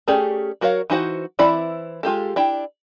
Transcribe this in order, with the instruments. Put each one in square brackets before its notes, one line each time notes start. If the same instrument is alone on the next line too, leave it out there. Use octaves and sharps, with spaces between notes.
[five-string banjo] A3 C#4 G4 G#4 D5
F#3 F#4 A#4 C#5 F5
E3 D#4 F#4 C5 F#5
E3 C4 E4 D5 B5
G#3 F4 G4 A4
D4 E4 G5